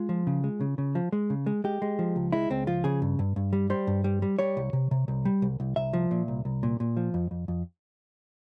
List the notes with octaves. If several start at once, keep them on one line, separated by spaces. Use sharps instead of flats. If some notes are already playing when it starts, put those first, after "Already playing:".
Already playing: G#3 F4
F3
C#3
G#3
C#3
C#3
F3
G#3
C#3
G#3
G#3 G4
G#3
F3
C#2
G#3 E4
C#2 C4
F3 F4
C#3 G#4
G2
G2
G2
G3
G3 C5
G2
G3
G3
G3 C#5
C2
C3
C3
C2
G3
C2
C2
C2 E5
F3
A#2
C2
C2
A#2
A#2
F3
F2
F2
F2